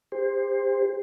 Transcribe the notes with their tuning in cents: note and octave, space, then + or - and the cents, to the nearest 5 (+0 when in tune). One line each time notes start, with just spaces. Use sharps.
G4 +35 C5 +0